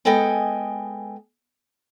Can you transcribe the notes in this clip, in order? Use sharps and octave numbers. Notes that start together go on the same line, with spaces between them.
G#3 B3 A4 D#5 G5 G#5